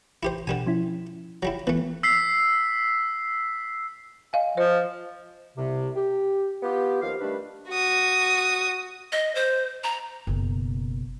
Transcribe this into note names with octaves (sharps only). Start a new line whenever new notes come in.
E4 G4 C5
B2 D3 G3 G#5 E7
F3 C#4 E4
F#3 G3 E4
E3 A3 B3
E6 B6 C7
D#5 F5 G#5
F3 C5 D#5
C2 C3
G4
B3 F4 G4
D#2 F3 F5
D#3 G3 A3 D4 B4
F#4 D#6
D#5
C5
A#5
F#1 B2